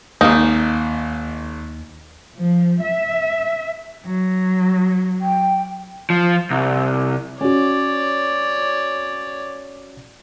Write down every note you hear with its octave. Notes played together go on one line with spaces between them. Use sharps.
G#1 D#2 A#3 D#4
F3
E5
F#3
G5
F3
C2
C#4 F#4 C#5 D5